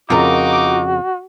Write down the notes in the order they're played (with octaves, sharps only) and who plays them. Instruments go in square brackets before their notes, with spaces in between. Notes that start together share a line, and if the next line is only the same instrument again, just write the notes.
[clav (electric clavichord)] F2 C#3 [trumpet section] D#4 D6 [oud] F4 A#4 [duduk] F#4